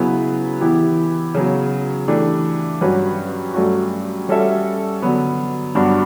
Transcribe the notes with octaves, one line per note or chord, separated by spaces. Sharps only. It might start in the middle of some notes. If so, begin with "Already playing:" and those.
Already playing: C#3 F#3 B3 E4 B4
E3 B3 E4 G4
C#3 F#3 B3
E3 A3 D4 G4
G2 F#3 C#4 F#4 B4
G2 F#3 A3 C#4 F#4
G3 C#4 F#4 A4 E5
D3 F#3 B3
G2 F#3 B3 D4 F#4